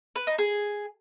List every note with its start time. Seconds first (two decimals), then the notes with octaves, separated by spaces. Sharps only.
0.16 B4
0.27 D#4
0.38 G#4